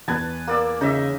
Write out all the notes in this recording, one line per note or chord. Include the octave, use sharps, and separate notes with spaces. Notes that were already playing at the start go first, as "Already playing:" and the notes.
E2 B3 B4 A5 G#6
A#3 D5 E6
C#3 D#4 D#5 E5